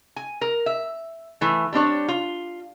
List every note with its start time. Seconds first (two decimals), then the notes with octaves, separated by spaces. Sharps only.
0.16 G#5
0.41 A#4
0.66 E5
1.41 E3 A3
1.73 G3 C4 D4 C#5
2.08 F4